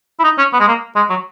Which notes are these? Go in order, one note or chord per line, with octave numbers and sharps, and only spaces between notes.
E4
D#4
C#4
B3
G#3
A#3
G#3
F#3